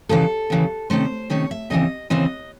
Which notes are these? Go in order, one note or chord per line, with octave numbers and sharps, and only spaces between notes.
D#2 C#3 E3 A4
D#2 C#3 E3
C3 D#3 A3 C#4 C5
C3 D#3 A3 C#4 C#5
E5
D#2 C#3 E3 C4 D#5
D#2 C#3 E3 C4 D#5